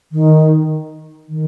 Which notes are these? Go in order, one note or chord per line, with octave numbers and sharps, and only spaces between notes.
D#3
D#3